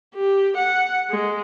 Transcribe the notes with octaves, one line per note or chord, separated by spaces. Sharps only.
G4
F#5
G#3